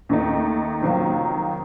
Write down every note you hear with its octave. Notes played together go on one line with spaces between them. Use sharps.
D#2 D#3 A3 D#4
F2 C3 D#3 F#3 A#3